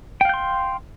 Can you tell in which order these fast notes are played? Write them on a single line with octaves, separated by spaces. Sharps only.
G5 F5 G6 C6